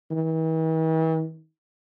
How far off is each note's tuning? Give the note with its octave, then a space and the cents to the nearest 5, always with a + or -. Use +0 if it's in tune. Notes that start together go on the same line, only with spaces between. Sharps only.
E3 -45